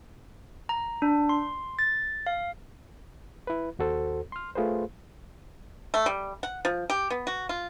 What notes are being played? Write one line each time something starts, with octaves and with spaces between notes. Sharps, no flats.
A#5
D4
C6
A6
F5
E4 B4
D#2 F#4 A4 C5
C6 F6
A3 F4 G#4 B4 C5
A3
G3
F#5
F3
G4
B3
F#4
F4